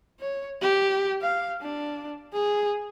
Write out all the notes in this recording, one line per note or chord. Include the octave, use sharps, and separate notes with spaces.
C#5
G4
F5
D4
G#4